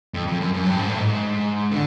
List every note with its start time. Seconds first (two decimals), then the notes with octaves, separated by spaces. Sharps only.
0.14 F2
0.27 F2
0.40 F#2
0.54 F#2
0.66 G2
0.79 G#2
0.89 A2
0.99 G#2
1.72 D3